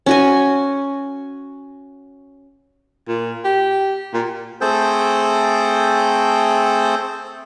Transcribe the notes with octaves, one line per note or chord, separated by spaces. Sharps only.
C#4 F#4 G#5
A#2
G4
A#2
A3 C4 G#4 A4 C5 G5